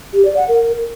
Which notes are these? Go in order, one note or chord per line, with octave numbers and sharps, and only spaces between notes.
G4
D5
F#5
A#4